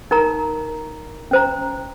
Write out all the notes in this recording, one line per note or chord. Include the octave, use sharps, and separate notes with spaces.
D#4 A#4 A#5
C#4 C5 A#5